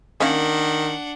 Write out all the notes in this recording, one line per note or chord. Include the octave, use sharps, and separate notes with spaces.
D#3 A#3 C#4 D4 F5 F#5